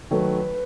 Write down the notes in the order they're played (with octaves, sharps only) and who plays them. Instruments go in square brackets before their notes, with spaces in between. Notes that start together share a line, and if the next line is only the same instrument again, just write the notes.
[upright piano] D#3 F#3 A3 [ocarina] B4